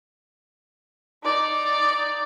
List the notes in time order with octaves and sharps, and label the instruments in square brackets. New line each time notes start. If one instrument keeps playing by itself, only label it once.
[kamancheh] D#4 D5